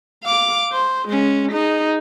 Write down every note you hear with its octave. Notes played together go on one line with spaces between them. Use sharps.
F5 D6
C5
G#3 C#4
D#4 G#4